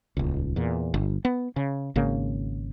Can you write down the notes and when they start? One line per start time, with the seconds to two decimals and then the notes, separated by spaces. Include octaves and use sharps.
0.17 D#1 C#2
0.56 E2 A#2
0.94 G1
1.25 B3
1.56 C#3
1.96 G#1 C#3 A#3